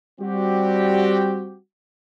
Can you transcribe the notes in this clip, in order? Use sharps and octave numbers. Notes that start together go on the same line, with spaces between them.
G3 C4 F#4 G4